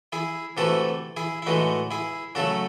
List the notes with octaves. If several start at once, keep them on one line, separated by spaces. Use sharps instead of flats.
E4 G#4
C3 E3 A3 F#4 A4
E4 G#4
E4
A2 E3 G#3 D#4 F#4
E4 G#4
C#3 F#3 A3 F#4 A4